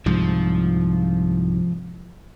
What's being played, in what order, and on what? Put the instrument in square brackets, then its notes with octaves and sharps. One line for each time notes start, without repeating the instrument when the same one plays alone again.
[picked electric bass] C2 G#2 [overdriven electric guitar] F3